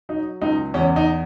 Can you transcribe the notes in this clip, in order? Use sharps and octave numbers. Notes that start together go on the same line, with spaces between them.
F#3 D#4
C#2 D#4
E2 C#4
D#4